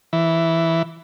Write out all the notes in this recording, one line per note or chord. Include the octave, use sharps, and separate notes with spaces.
E3